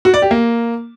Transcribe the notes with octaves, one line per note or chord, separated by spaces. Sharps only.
F#4
D5
G4
A#3